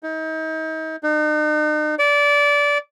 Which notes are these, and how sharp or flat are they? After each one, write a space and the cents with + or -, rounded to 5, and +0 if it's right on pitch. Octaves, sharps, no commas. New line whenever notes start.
D#4 +35
D#4 -40
D5 -20